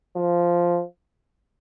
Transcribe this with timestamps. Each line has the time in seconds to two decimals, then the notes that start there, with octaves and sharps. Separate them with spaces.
0.16 F3